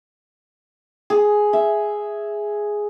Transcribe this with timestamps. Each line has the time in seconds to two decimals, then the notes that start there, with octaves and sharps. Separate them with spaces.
1.10 G#4
1.53 E5